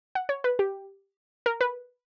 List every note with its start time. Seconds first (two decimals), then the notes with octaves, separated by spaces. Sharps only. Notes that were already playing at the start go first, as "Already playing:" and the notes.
0.15 F#5
0.29 C#5
0.44 B4
0.59 G4
1.46 A#4
1.61 B4